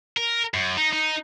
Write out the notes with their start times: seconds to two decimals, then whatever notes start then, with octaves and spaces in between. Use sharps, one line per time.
0.17 A#4
0.54 F#2
0.78 D#4
0.93 D#4